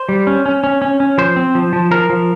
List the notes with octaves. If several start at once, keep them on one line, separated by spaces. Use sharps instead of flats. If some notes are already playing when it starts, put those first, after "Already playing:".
Already playing: C5
G3
C#4
C#4
C#4
C#4
C#4
F3 C5
C4
F3
F3
F3 A#4
F3